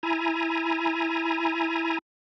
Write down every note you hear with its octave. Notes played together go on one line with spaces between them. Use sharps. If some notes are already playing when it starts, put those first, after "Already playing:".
E4 G#5 A#5